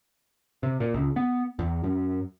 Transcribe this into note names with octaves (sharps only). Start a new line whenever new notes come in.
C3
A#2
C#2
B3
E2
F#2